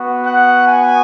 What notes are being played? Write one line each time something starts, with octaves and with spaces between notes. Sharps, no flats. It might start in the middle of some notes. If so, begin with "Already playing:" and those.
Already playing: B3 F#4
F#5
G#5